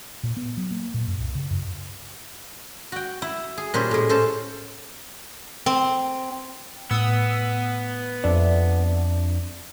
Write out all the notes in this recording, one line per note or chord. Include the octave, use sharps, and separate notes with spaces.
A#2
B3
F#3
A#3
A#2
F#2
C2
C#3
F#2
F#4 G5
E4
G#4
A#2 G3 C#4 C5
A2 G#3
C#4 A4 C5 A5
C4
A2 B3 D#6 E6
F2 D4 D5 E5